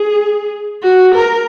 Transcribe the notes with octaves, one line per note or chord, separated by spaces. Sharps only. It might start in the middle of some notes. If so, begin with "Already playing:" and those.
Already playing: G#4
F#4
A#4